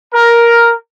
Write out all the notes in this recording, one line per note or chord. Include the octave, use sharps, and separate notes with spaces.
A#4